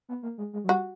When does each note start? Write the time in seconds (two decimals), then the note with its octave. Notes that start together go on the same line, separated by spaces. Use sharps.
0.09 B3
0.23 A#3
0.38 G#3
0.53 G#3
0.64 F#3
0.68 G3 F#4